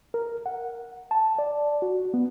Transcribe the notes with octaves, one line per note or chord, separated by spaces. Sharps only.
A#4
F#5
A5
D5
F#4
B3